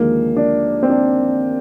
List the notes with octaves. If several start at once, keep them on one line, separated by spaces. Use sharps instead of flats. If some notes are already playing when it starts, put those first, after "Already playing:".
Already playing: D#2 D3 F3 G#3 A#3
D4
C4
D4